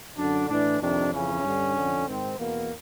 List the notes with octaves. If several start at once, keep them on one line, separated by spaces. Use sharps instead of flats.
F#2 D3 D4
A2 E3 D4
F2 C3 D#3 D4
F2 C#3 E3 C#4
G2 D3
F2 D3
G#2 D#3 C4
E2 B2 A#3